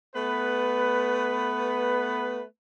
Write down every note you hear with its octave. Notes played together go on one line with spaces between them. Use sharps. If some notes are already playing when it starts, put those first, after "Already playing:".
A3 B3 B4